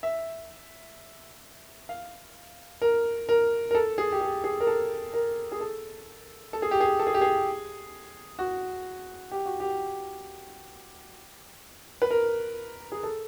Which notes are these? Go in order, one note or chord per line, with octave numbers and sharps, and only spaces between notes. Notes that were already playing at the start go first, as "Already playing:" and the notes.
E5
F5
A#4
A#4
A#4
A4
G#4
G4
G#4
G#4
A#4
A4
A#4
G#4
A4
A4
G#4
G4
G#4
A4
G#4
G4
G#4
F#4
G4
F#4
G4
B4
A#4
G#4
A4